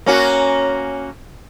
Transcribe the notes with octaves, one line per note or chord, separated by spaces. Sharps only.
A#3 C#4 F#4